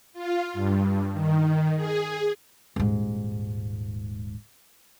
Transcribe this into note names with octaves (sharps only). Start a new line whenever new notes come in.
F4
G2
D#3
G#4
D#1 G#2